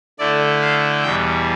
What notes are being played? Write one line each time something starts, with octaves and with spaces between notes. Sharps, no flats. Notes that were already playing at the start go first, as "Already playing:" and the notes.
D3 A3 E4 D5
F5
E2 B2 G3 G5